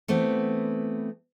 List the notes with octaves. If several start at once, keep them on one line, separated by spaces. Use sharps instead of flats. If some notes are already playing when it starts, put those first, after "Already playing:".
E3 A3 B3 C4